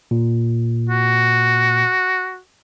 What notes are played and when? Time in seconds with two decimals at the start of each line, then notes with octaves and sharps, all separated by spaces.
0.11 A#2
0.89 F#4